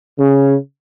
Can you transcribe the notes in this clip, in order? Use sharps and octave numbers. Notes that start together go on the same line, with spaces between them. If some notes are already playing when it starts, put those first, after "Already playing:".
C#3